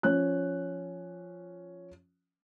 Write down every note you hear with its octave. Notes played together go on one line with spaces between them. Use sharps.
F3 C#4 F#6